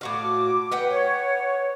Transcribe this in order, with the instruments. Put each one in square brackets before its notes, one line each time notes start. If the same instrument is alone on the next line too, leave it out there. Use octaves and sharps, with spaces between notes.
[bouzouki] A2 F#4 F5 [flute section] D6
[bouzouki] B4 F#5 G5
[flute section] C#5